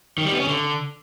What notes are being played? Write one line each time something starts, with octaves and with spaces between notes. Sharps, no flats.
D#3
G3
B3
C#4
D3